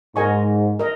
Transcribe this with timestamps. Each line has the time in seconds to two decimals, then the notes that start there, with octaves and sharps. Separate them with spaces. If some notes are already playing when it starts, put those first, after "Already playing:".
0.16 G#2 A#4 D#5 G#5 C#6
0.79 A#4 D#5